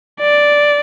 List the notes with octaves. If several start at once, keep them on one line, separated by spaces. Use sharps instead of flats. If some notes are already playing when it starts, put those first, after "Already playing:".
D5